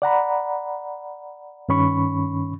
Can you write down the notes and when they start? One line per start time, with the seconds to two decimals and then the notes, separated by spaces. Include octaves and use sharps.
0.02 D5 F#5 A#5 B5
1.69 G2 D#3 C#4 B5 C#6